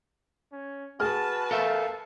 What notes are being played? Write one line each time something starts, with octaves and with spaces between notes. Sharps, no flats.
C#4
F#4 G#4 B4 A5 F6
A4 A#4 E5 F5